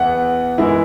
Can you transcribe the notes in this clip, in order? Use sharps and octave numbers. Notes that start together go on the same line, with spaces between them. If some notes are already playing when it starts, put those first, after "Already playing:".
Already playing: E2 E3 B3 E4 F#5
F#2 E3 G#3 E4